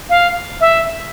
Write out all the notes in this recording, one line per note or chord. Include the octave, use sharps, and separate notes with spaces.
F5
E5